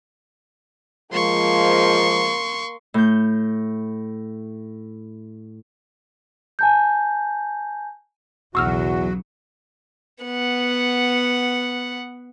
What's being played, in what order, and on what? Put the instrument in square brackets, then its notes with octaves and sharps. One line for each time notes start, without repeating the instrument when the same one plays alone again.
[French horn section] F3 G#3 [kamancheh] A#3 [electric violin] C6 C#6
[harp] A2 G6
[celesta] G#5 A5 G6
[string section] B1 C#3 F#3 [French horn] E2 [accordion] F#4 [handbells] C#6 E6 F6
[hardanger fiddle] B3 F#5